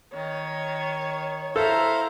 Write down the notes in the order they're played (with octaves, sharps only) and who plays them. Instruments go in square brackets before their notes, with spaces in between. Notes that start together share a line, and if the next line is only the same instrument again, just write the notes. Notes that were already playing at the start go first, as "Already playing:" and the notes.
[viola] D#3 [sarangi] C#5
[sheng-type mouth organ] E4 C5 F5 [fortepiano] A4 [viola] A#5